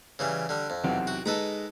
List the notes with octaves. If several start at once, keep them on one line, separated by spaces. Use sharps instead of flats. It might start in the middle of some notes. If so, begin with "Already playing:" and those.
C#3 E3 G3
D3 G3
F2
B1 E2 C3
F#4
G#3 D#4 A4 B4 A#5